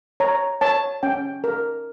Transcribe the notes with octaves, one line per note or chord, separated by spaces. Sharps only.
C#5 A#5
C#5 A5
C#4 G5
A#4